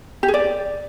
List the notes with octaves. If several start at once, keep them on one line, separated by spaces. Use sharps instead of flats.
G4
G#4
D5